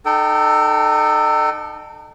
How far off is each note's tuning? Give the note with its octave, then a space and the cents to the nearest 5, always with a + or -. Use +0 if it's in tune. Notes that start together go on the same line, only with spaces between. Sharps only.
D#4 -35 A4 +0 G5 -30